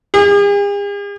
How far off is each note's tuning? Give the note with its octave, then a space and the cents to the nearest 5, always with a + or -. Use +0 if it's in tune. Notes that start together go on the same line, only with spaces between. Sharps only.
G#4 -45